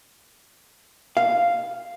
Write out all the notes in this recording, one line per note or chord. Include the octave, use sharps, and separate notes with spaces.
F5